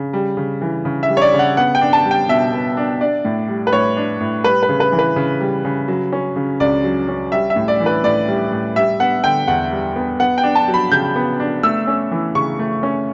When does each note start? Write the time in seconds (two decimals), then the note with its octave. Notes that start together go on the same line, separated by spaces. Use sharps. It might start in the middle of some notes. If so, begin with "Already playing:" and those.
Already playing: C#3
0.13 G3
0.37 C#3
0.61 E3
0.85 C#3
1.03 E5
1.09 G3
1.17 C#5
1.22 D5
1.33 C#3
1.39 F#5
1.57 B3 F#5
1.75 G5
1.81 D4
1.93 A5
2.05 G3
2.11 G5
2.29 B2 E5
2.53 B3
2.77 D4
3.01 D4 D5
3.25 A2
3.49 G3
3.67 B4
3.73 A2 C#5
3.97 D4
4.20 A2
4.44 G3 B4
4.63 B4
4.69 C#3
4.80 B4
4.92 E3
4.99 B4
5.16 C#3
5.41 G3
5.65 C#3
5.88 F#3
6.13 C#4
6.36 C#3
6.60 C#2 D5
6.84 F#3
7.08 C#4
7.32 G3 E5
7.50 E5
7.56 A2
7.68 D5
7.80 E3
7.86 B4
8.04 A2 D5
8.28 G3
8.52 A2
8.76 G3 E5
9.00 B3 F#5
9.24 D3 G5
9.48 E2 F#5
9.72 G3
9.96 B3
10.20 B3 F#5
10.38 G5
10.43 D4
10.55 A5
10.68 F#3
10.74 B5
10.92 C#3 G6
11.16 B3
11.40 D4
11.63 A3 E6
11.87 C#4
12.11 E3
12.35 C#3 C#6
12.59 A3
12.83 C#4